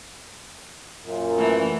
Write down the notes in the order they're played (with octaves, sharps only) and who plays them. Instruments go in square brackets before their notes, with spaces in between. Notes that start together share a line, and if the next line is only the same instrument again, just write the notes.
[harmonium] F#2 A#2
[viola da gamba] E3 A3